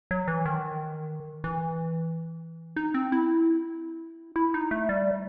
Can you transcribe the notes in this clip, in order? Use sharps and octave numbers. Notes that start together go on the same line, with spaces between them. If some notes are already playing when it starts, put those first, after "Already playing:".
F#3
E3
D#3
E3
D#4
C4
E4
E4
D#4
A3
G3